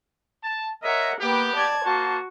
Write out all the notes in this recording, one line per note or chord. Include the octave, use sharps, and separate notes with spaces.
A5
A#4 C#5 D#5 E5 F#5
A#3 B3 G4 B4
D5 A5 G#6
A#3 F#4 C5 A5